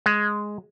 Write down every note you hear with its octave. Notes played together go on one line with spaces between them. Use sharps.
G#3